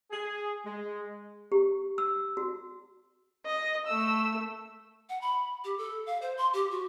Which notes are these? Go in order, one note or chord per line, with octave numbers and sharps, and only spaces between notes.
G#4
G#3
G4
E6
F#4
D#5
A3 E6
F#5
B5
G4
A4
F5
C5
C6
G4
F#4